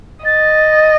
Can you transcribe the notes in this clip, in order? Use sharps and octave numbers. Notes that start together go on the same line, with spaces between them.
D#5 A6